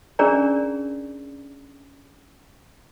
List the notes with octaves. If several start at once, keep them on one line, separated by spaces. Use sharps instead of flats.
C#4 D4 G#4 A#4 D5 A#5